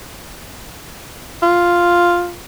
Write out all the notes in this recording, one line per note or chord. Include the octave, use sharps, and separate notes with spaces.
F4